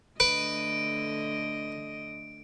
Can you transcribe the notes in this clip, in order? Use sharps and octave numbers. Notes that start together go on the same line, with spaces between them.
D3 A3 B4 D#5 D7